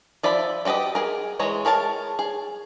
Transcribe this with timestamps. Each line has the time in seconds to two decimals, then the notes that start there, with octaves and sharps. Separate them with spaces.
0.23 F3 D5 E5 B5
0.65 G3 F#4 G4 B4 D#5
0.95 G#4 A#4
1.39 E3 G#3 C#5 A#5
1.65 G#4 A#4 C#5 A5
2.19 G#4